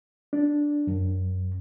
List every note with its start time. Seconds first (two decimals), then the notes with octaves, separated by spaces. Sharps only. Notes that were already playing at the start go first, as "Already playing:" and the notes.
0.33 D4
0.87 F#2